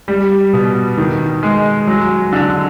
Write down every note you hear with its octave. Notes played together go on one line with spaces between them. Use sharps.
G3
B2
D#3
G#3
F#3
D3